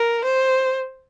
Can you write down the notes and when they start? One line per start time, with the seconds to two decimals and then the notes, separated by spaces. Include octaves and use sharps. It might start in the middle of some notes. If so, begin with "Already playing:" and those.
Already playing: A#4
0.25 C5